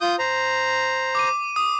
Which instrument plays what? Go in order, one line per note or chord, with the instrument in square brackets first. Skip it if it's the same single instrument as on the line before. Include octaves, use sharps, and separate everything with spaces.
[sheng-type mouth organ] F4 D#6 G6
C5 A#5
[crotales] D6 D#7
D#6